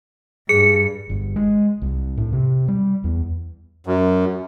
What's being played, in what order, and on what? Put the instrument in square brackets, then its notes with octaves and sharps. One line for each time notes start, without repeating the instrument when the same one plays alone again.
[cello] G2 [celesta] G#4 [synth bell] C#7
[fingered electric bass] G1
G#3
C2
A2
C3
G3
E2
[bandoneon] F#2